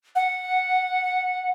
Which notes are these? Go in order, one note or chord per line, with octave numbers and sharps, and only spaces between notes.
F#5